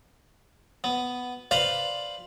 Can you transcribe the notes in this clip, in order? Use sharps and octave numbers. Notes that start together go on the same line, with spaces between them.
B3
B4 C5 D5 F5 B5 C6